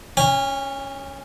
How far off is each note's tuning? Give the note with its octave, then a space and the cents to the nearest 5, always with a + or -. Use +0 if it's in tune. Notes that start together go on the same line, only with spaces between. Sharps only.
C#4 +0 G#5 -40